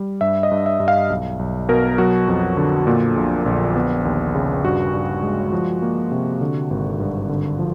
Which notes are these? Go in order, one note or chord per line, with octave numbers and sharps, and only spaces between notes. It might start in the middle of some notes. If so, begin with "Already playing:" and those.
Already playing: G3
G2 E5
D#5
G2
E5
G2
F5
B1
B1
B2 A#4
F#3 F#4
F2
D3
A#2
A#1
A#1
B3
D#2
C#3
G2 F#4
G2
G#3
F3
A#3
C3
D3
G#1
G2
D3
F3